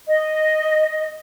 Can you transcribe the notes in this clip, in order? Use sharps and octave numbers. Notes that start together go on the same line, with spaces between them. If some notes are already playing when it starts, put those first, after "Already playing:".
D#5